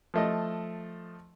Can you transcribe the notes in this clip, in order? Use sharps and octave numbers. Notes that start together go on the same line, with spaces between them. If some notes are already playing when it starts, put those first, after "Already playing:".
F3 A3 D#5